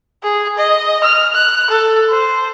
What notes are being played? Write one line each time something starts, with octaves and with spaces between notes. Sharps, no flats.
G#4
D#5
F6
F#6
A4
C5